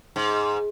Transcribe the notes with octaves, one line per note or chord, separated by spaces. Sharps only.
G#2